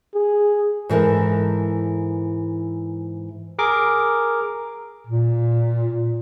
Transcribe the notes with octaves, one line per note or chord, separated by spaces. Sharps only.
G#4
G#2 E3 A4 A#4
G#4 A#4 D6
A#2